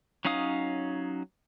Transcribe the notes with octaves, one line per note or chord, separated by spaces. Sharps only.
F#3 C#4 D#4 F5 D#6